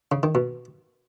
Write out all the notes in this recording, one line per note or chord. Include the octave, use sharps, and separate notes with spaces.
C#3
D#3
B2